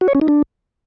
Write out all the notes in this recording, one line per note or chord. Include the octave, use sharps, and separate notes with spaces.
F#4
C#5
C#4
D#4
D4